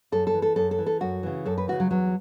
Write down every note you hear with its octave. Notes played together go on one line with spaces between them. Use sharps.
F#2 A4
A4
E3
A4
F#2 A4
A4
E3
A4
F#2 F#4
C#3 E3
F#2 A4
B4
C#3 E3 F#4
F#3
E2 F#3